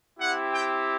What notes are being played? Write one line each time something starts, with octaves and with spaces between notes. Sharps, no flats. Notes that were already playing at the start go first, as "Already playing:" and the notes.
C4 E4 G4 F#5
G5